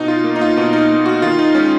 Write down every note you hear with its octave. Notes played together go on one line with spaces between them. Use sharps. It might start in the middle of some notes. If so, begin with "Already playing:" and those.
Already playing: B2 D#4
F4
A#3
D#4
F4
B2 D#4
D#4
A#3
F#4
D#3 F4
D#4
G#3 C#4